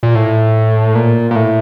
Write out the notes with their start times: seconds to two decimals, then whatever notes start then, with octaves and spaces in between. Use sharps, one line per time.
0.03 A#2
0.15 A2
0.95 A#2
1.31 A#2
1.35 A2